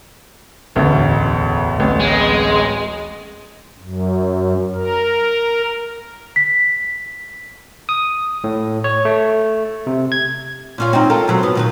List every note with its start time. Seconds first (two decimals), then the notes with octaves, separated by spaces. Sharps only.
0.75 E1 A1 D2
1.78 D1 A1
2.00 G#3
3.79 F#2
4.75 A#4
6.36 B6
7.89 D#6
8.44 A2
8.84 C#5
9.05 A3
9.87 C3
10.12 G#6
10.78 A#2 C#4 F4
10.93 C4 D#4
11.10 F4 A4 A#4
11.28 B2 F#3 C4
11.43 B3
11.55 A#2 D#3 B4